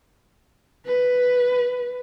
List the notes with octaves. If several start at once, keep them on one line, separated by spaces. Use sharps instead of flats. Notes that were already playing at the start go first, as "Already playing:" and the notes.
B4